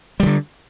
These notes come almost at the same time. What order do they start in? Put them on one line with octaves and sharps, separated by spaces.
G3 D#3 D3